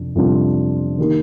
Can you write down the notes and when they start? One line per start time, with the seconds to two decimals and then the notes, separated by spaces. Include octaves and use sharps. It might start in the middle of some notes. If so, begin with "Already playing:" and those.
Already playing: F2 C3 D4
0.15 F2 C3 G3 D4 F4
0.98 D#3 A#3 D#4 G4